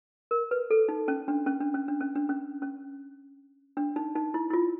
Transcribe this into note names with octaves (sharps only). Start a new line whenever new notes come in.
A#4
B4
A4
D#4
C#4
D4
C#4
D4
C#4
D4
C#4
D4
C#4
C#4
D4
D#4
D#4
E4
E4
F4